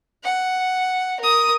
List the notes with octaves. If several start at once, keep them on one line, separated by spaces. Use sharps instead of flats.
F#5
A#4 D#6